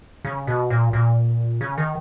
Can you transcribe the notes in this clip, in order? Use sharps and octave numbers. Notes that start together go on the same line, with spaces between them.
C#3
B2
A#2
A#2
C#3
D#3